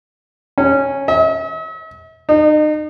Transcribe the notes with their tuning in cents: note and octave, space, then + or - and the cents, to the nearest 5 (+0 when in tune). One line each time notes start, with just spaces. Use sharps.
C#4 -10
E5 -45
D#4 -35